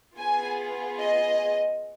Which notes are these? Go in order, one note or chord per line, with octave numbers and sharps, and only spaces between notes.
B3 F4 G#4 G#5
D#5